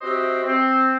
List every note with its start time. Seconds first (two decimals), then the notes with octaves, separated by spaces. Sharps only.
0.01 C4 F#4 G4 C5 D#5 E5
0.44 C4